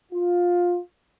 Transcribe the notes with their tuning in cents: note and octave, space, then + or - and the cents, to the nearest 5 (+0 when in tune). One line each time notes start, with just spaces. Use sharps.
F4 +15